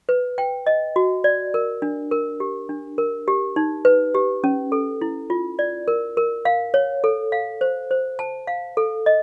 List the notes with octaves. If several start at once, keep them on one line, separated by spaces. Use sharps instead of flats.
B4
G5
D#5
F#4
D5
A#4
D4
A#4
G4
D4
A#4
G4
D#4
B4
G4
C#4
A4
E4
F4
D5
A#4
A#4
F5
C#5
A4
F5
C5
C5
A5
F5
A4
D#5